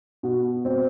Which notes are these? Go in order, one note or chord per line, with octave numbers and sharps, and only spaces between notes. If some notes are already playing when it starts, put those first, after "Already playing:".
B2
C4